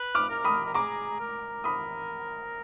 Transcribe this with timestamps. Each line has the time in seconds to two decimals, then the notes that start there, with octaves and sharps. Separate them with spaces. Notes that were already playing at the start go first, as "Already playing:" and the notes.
Already playing: B4
0.15 D6 F6
0.29 A#4
0.45 B5 D#6
0.65 A#4
0.74 G#4 A#5 D6
1.19 A#4
1.64 B5 D#6